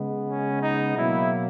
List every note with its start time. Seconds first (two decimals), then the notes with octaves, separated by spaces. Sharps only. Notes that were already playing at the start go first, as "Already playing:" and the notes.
Already playing: C#3 G#3 B3
0.28 C#4
0.62 D#4
0.97 B2 F#3 A#3 E4